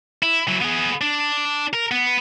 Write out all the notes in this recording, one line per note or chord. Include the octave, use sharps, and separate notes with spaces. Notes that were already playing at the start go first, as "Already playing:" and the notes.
E4
F#3 E4
B3 G#4
D4
A#4
B3